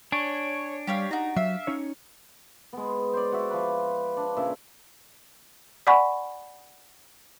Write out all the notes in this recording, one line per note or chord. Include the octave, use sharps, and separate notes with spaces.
D4 C#5 G#5
G3 G4 C#5 F5
D#4 F#4 A#5
F#3 E5 F5
C#4 D#4 C#5
G#3 B3
C5 D5
F#4 E5
F3 B4
D4
A#2 C#3 E5
D5 F#5 G#5 B5 C#6